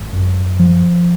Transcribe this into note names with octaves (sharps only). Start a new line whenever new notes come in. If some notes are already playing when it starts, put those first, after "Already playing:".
Already playing: G#1
F#2
F3